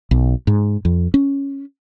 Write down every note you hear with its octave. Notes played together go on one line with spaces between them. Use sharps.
B1
G#2
F2
C#4